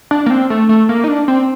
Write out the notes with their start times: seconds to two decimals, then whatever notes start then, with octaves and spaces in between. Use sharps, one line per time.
0.11 D4
0.26 A#3
0.30 C4
0.50 A3
0.69 A3
0.89 A#3
1.04 D#4
1.08 D4
1.28 C4